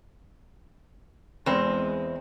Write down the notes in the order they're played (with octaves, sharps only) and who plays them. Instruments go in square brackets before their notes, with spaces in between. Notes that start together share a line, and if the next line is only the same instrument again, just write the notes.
[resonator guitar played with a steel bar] E2 C4 [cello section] G#3